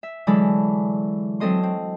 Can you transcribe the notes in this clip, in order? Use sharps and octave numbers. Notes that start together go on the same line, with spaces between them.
E5
D3 E3 F#3 G#3 A4 B5
F#3 C4 A4 D#5 C6
C4